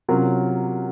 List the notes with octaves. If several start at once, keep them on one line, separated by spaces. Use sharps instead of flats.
C3 F#3 C#4 F4 A#4